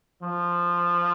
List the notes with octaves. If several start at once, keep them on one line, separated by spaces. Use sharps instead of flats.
F3